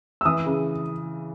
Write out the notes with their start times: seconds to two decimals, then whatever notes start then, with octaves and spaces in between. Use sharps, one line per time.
0.21 E6
0.25 E3 D#6
0.46 C#3